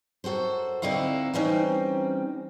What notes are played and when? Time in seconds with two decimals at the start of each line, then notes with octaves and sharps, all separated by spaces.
0.24 F#2 F#4 A4 C5
0.82 D2 D3 C4 D#4 E4 F5
1.34 E3 G3 C4 C#4 D#4